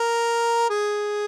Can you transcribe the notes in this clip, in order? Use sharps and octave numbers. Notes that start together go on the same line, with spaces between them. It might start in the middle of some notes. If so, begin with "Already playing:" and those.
Already playing: A#4
G#4